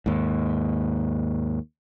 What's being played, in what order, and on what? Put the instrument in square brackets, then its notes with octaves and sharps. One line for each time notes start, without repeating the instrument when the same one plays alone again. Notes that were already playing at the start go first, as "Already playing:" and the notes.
[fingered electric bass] D#2 G#2